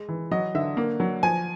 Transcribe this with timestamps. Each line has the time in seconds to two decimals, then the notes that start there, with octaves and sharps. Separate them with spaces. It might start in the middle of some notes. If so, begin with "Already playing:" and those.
Already playing: G#3
0.09 E3
0.31 F#3 D#5
0.55 D3 E5
0.77 A#3
1.00 F#3
1.23 F3 G#5